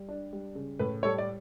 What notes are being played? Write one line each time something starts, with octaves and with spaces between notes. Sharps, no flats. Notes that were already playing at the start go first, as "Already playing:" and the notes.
Already playing: G3
D4
G3
C#3
A2 B4
G3 A4 C#5
D5